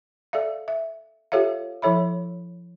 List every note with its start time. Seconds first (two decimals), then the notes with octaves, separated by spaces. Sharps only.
0.33 A4 D5 E5 F5
0.68 E5
1.32 F4 G4 A4 C#5 E5 F5
1.82 F3 E4 A4 C#5 E5 B5